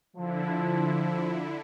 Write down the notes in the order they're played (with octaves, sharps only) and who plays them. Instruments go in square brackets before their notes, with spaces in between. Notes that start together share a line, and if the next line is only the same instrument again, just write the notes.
[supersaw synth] D3 E4 [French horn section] F3